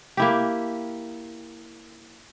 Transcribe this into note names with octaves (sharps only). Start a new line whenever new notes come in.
A#3 E4 G4